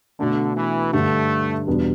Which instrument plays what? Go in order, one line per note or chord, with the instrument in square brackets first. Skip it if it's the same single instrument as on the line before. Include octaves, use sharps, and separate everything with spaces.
[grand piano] B2 A3 D4 [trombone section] D3
[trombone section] E3
[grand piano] G2 D3 G3 D4 [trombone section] A3
[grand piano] E2 B2 G3 B3 D4